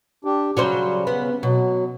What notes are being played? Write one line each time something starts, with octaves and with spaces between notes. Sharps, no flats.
D4 G4
C#3 F#3 G3 C#4 C5
B3
B2 F#3